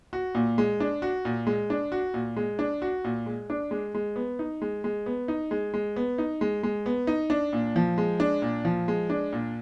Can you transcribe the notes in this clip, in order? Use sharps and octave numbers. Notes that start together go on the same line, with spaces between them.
F#4
A#2
G#3
D4
F#4
A#2
G#3
D4
F#4
A#2
G#3
D4
F#4
A#2
G#3
D4
G#3
G#3
B3
D#4
G#3
G#3
B3
D#4
G#3
G#3
B3
D#4
G#3
G#3
B3
D#4
D4
A#2
F3
G#3
D4
A#2
F3
G#3
D4
A#2